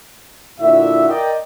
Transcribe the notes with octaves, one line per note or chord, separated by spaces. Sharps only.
A#2 D3 E4 F#4 E5
A#4 D5 D#5 G5